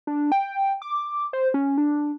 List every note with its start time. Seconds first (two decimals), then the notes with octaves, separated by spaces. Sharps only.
0.07 D4
0.32 G5
0.82 D6
1.33 C5
1.54 C#4
1.78 D4